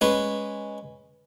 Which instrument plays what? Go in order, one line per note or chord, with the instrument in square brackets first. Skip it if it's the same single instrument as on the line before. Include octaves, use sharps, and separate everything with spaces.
[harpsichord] G#3 C#4 B4